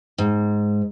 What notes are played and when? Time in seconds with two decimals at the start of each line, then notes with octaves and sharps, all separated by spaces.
0.18 G#2